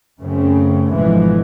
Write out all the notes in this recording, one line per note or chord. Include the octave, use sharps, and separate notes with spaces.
F#2 C#3 A3 C4
G#1 B2 D3 E3 F3 G#3